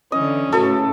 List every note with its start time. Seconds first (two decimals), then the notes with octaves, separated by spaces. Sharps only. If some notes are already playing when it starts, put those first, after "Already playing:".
0.12 D3 E3 C#4 D#5
0.53 A2 C#3 F#4 A4 B4